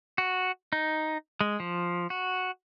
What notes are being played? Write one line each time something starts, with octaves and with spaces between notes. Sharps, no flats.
F#4
D#4
G#3
F3
F#4